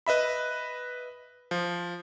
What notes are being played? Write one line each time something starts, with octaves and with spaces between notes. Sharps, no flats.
B4 D#5 E5 B5
F3